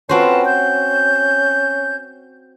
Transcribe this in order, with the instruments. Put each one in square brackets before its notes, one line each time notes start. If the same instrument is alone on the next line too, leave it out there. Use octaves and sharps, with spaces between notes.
[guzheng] C4 F#4 C5 [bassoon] C#4 [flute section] F4 B4 A5
[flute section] G6